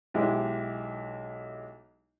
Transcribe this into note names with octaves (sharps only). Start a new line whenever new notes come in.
B1 G#3 E4 G4